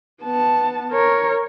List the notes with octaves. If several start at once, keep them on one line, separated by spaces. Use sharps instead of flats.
B3 A5
A#4 C#5